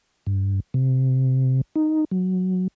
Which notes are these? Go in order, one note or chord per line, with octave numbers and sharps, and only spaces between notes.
G2
C3
D#4
F#3